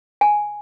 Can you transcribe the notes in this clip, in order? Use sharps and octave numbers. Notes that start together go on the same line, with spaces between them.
G#5